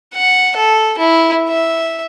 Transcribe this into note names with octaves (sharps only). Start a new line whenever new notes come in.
F#5
A4
E4
E5